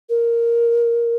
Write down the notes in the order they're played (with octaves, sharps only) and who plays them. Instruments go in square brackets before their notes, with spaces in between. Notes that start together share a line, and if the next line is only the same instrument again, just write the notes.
[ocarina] A#4